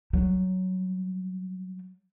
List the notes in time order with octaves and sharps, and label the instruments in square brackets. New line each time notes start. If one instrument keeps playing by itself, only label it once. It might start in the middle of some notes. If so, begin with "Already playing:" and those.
[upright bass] F#3 G3